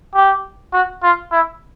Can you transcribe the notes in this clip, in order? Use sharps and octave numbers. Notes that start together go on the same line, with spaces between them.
G4
F#4
F4
E4